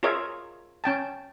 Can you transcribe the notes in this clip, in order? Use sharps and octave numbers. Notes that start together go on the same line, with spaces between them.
F4 G#4 A#4 C#5 D#5 E5
C#4 G5 A5